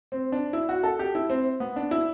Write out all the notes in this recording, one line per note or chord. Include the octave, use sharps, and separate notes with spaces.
C4
D4
E4
F#4
A4
G4
E4
C4
B3
D4
E4